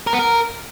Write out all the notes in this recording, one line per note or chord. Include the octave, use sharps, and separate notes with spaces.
A#4
B3
A#4